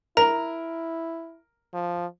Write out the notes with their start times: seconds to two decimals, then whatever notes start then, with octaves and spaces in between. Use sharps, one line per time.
0.17 E4 A#4 A#5
1.74 F3